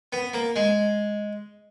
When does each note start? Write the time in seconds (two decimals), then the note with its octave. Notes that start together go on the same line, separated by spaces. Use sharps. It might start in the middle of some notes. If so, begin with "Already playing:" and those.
0.13 B3
0.33 A#3
0.56 G#3